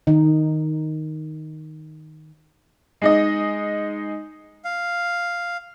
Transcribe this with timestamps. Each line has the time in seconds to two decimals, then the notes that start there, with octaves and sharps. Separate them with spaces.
0.07 D#3 D#4
3.02 G#3 D#4 D#5
4.65 F5